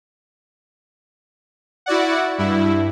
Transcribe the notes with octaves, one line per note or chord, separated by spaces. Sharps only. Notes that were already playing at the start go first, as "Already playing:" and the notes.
E4 F#4 D5 F#5
G2 E4